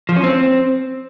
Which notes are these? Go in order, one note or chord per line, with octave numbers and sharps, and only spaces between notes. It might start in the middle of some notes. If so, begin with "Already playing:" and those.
F3
C#4
C4